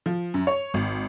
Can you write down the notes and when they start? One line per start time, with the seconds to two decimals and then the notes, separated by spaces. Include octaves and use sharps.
0.06 F3
0.34 F#2
0.47 C#5
0.74 G#1